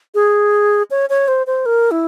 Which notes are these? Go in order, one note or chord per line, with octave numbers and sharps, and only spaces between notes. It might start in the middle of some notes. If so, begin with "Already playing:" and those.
G#4
C#5
C#5
C5
C5
A#4
E4